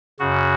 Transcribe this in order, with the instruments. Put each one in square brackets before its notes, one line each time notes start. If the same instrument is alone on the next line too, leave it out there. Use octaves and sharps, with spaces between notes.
[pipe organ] F#2 C#3 F#4